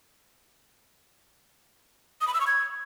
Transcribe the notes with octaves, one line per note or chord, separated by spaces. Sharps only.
D#6
B5
E6
C#6
G#6